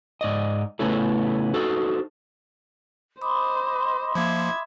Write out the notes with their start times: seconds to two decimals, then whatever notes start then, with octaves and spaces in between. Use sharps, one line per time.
0.21 G#2 D5 D#5
0.79 C#3 A3 B3 C#4 E4 A4
1.54 D#4 F#4 A4 C5
3.21 C5 D#5 B5 C6 D6 D#6
4.15 F3 A#3 E5 G#6